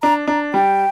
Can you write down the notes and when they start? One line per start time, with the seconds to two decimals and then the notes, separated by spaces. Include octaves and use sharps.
0.02 D4 A#5
0.28 D4 A#5
0.54 G3 G5